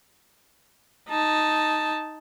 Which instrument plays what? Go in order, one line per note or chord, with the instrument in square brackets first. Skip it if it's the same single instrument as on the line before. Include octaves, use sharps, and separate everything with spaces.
[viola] D#4 A5